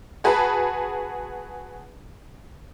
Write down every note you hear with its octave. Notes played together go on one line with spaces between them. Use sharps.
F#4 G#4 B4 A5 B5